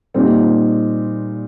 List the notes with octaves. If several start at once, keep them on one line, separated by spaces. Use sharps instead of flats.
A#2 G3 C4 D#4